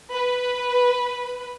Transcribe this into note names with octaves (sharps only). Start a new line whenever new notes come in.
B4